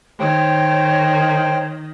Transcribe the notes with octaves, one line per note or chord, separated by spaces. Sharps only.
D#3 C5 C#5 G5